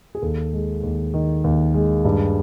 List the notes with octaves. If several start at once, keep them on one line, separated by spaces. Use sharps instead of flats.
G#4
D#2 A4
G#3
D#2
D#3
D#2
G#3
G2